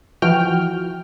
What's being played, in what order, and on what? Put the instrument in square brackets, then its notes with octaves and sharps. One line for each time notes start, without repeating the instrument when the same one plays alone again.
[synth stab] E3 F3 F#4 G5 F6